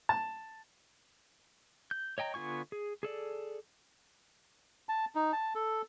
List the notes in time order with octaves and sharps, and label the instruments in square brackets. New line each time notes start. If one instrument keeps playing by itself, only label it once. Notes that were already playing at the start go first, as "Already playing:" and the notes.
[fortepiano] A5
[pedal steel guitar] G6
C#5 D#5 G5 A#5
D3 B3 F4 G#5 C#6
G#4
G#4 A4 D5
[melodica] A5
D#4
A5
A4